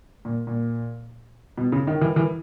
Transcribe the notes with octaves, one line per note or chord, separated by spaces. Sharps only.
A#2
A#2
B2
C#3
D#3
E3
E3